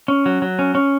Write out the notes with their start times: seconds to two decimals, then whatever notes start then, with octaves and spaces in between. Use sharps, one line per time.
0.08 C#4
0.26 F#3
0.42 F#3
0.59 C#4
0.75 C#4